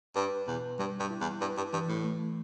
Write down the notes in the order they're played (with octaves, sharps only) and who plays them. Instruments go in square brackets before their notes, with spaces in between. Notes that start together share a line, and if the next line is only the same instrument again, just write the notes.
[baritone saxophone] G2 [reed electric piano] B4
[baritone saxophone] E2 [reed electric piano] B2
[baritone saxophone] G2 [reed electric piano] G3
[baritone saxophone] G2
[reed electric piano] E4
[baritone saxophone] E2
[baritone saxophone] G2 [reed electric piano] B4
[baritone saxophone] G2
[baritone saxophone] G2 [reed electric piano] E3
[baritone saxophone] A2
[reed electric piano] A3